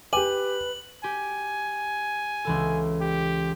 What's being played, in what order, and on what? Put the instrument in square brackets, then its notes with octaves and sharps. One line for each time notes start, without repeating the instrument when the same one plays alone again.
[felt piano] G4 D6 [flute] B4 [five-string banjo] G#5 [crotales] F#7
[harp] G4 [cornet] G#5
[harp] C#2 E3 A4
[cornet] G4